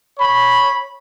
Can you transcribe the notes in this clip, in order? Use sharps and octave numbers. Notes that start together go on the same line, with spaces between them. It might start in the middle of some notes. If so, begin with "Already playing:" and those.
C#5 B5